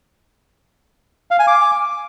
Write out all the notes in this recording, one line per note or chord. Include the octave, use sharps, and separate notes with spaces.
F5
G#5
D6